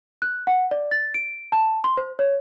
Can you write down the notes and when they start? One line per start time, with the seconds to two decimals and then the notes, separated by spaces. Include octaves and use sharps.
0.22 F#6
0.47 F#5
0.71 D5
0.91 A6
1.14 D7
1.52 A5
1.84 C6
1.97 C5
2.19 C#5